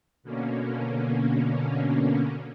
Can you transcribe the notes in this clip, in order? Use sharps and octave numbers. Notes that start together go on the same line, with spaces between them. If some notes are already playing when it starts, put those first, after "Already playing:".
B2 D3 A#3 C#4